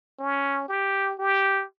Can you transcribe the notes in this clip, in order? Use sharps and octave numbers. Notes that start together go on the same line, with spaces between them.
C#4
G4
G4